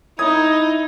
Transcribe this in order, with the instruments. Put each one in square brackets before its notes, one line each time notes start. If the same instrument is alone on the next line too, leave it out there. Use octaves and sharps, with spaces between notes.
[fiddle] D#4 [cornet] E4 [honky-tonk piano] D#6 [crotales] G#6